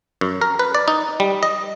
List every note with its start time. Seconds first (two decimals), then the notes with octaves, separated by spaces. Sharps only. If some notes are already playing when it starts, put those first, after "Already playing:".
0.21 F#2
0.41 A#4
0.59 B4
0.75 D5
0.88 D#4
1.20 G3
1.43 D#5